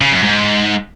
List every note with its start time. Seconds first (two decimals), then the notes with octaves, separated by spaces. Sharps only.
0.01 C#3
0.12 F#2
0.24 G#2